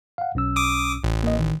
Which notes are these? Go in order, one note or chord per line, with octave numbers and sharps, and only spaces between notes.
F5 F#5
B1 C#4 E6
D6 D#6
A1
A#3 D#5
D#3